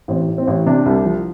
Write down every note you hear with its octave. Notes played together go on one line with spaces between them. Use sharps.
A1 C4
A2
C4
A1
C3 D4
C2
F3